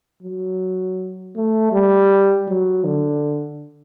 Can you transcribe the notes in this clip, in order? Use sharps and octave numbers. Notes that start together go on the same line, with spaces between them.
F#3
A3
G3
F#3
D3